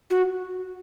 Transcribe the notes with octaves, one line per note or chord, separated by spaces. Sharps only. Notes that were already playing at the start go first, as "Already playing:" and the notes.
F#4